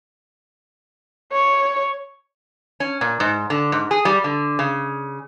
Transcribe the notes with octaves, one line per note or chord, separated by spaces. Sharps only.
C#5
C#4
A#2
G#2
D3
G#2
G#4
G3
D3
C#3